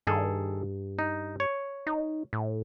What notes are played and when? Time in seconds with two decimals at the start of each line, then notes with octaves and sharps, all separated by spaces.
0.07 G2 D#3 G#4 A4
0.99 D#4
1.40 C#5
1.87 D#4
2.33 A2